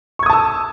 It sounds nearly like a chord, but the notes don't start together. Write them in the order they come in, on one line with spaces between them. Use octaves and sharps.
C#6 G#6 D#6 A5 E6